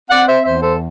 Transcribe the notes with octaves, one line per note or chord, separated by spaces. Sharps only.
C4 D5 F#5
C5 E5
E2 C5 E5
A4 C5